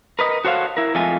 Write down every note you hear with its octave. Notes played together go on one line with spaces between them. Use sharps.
A#4 B4 D#5
F#4 A4 C5 C#5 F5 F#5
E4 A#4
F2 G#3 A3 F4 G#5